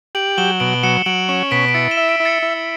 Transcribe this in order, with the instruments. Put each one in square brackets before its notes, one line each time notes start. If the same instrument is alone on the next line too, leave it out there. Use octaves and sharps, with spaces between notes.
[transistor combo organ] G4 [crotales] D7 F#7
[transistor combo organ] F#3 [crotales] E7 G7
[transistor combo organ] B2 [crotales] D7 F#7
[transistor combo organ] F#3 [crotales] C#7 E7
[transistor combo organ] F#3 [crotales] D7 F#7
[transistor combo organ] C#4 [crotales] C#7 E7
[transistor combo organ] B2 [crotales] B6 D7
[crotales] D7
[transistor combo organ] E4 [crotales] A6 C#7
[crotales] E7 G7
[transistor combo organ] E5
[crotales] B6 D7
[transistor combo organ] E4
[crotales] A6 C#7
[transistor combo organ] E4